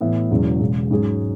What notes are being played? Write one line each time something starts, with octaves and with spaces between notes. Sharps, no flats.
A2 E3 B3 E4
E1 E2 C#3 F#3
E1 E2 C#3
G#2 F#3 C#4 G#4